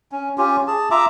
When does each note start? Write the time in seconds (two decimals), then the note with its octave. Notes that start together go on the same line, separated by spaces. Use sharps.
0.12 C#4
0.38 C#4 F4 G4
0.68 G#4 A5
0.91 F4 E5 A#5 D6